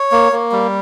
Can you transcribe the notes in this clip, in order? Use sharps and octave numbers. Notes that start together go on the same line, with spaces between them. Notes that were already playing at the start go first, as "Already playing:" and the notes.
Already playing: C#5
A#3
A#3
G3